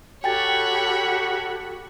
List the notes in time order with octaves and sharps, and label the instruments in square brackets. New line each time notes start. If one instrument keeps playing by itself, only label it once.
[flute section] F#4 G4 A4 [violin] C#5 B5 [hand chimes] G5 G#5 A6